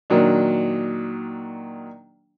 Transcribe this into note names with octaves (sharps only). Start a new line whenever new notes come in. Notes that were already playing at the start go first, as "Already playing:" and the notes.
A#2 D#3 F#3 D4